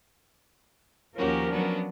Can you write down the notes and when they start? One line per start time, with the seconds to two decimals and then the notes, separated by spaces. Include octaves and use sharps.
1.16 D#2 F3 C#4 F#4 G4 A#4
1.51 F#3 B3 D4